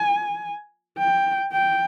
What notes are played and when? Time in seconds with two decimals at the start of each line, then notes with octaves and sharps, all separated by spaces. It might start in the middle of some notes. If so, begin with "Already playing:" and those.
Already playing: G#5
0.98 G5
1.52 G5